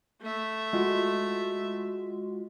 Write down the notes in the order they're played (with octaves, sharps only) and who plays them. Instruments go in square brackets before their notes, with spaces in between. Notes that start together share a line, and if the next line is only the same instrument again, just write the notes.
[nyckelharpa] A3 E5
[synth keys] G#3 F4 F#4